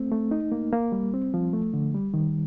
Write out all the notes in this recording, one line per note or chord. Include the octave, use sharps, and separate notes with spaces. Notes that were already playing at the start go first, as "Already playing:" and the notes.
Already playing: A3 C4
A3
D#4
A#3
A#3
G3
C4
F3
A3
D3
G3
D#3